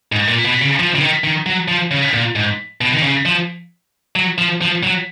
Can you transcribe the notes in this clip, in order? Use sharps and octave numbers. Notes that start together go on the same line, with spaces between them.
G#2
A#2
B2
C#3
F3
C#3
D#3
D#3
F#3
F3
C#3
A#2
G#2
B2
D#3
C#3
F3
F#3
F3
F3
F#3